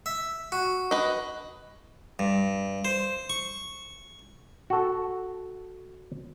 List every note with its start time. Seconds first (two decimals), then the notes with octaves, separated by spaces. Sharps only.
0.06 E5
0.52 F#4
0.91 B4 D#5
2.19 G2
2.85 C5
3.30 C#6
4.70 F#4 A4